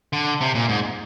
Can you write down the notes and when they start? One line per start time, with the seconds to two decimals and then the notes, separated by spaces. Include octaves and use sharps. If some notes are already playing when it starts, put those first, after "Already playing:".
0.13 D3
0.41 C3
0.55 A#2
0.69 G#2